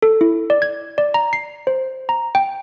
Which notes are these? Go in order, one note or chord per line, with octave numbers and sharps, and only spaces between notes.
A4
E4
D5
G#6
D5
A#5
C7
C5
A#5
G5